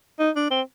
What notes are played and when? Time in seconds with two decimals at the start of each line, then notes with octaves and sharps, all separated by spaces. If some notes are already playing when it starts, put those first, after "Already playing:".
0.19 D#4
0.36 D4
0.50 C4